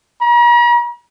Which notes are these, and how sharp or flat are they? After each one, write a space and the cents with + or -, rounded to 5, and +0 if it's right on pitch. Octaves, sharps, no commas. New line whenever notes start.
A#5 +45